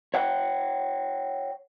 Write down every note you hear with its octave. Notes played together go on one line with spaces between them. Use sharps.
C#5 F#5 G5